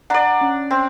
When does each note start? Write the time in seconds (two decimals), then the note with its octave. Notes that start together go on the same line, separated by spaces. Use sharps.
0.10 D4 D5 F#5 A#5
0.41 C#4
0.71 C4